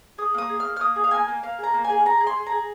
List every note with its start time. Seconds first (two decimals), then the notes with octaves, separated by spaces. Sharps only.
0.18 G#4 D#6
0.34 A#3 D#6
0.49 G#4
0.60 A#3 F6
0.76 F6
0.80 A#3 D#6
0.96 G#4
1.04 F5
1.11 A#3 G#5
1.28 A#3
1.43 A#3 F5
1.58 G#4 A#5
1.74 A#3
1.84 G#4 G#5
2.05 G#4 A#5
2.20 G#4
2.27 C6
2.36 G#4
2.46 A#5
2.52 G#4